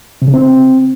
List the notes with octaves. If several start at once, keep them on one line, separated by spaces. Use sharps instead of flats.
C3
C#3
C4